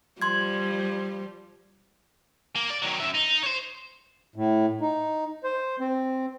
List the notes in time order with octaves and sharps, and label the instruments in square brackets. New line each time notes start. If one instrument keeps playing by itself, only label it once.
[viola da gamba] F3 G3 [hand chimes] C6 G#6
[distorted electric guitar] A#3
D5
D#3 F#3
F#2 E5
D#4
C5 C#5
[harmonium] A2
D#4
C5
C4